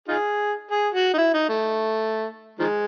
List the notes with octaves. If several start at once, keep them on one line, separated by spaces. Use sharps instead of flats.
D#4 F4 G#4
G#4
F#4
D#4
E4
D#4
A3
D#3 F3 G#3